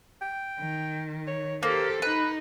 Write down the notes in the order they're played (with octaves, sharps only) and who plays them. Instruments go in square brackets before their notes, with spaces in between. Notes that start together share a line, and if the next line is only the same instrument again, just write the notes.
[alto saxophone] G5
[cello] D#3
[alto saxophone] C#5
[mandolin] A#3 [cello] G4 A4 [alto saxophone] C5
[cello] D#4 [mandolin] B4